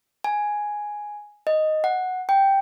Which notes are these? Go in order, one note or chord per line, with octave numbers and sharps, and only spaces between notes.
G#5
D#5
F#5
G5